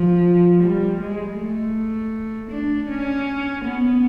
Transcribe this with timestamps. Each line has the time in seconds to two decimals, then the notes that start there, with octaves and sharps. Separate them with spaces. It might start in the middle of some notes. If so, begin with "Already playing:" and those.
Already playing: F3
0.63 G3
1.01 G#3
1.37 A3
2.51 D4
2.89 C#4
3.65 B3